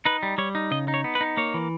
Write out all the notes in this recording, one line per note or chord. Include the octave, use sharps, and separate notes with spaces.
D#4 B4
G3
G3 C#5
D#4
C#3 D#5
D#4
C#5
B3
B4
D#4
A#3 C#5
E3